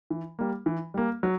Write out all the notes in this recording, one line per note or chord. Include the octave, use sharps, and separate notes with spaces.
E3
G3 A#3
E3
G3 A#3
F#3